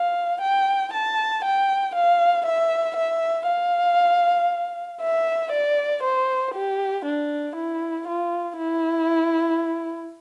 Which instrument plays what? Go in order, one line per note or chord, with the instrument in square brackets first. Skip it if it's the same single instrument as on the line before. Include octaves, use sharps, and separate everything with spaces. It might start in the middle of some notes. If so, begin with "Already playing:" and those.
Already playing: [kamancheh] F5
G5
A5
G5
F5
E5
E5
F5
E5
D5
C5
G4
D4
E4
F4
E4